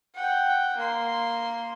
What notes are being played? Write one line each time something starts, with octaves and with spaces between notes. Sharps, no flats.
F#5 G5
A#3 C6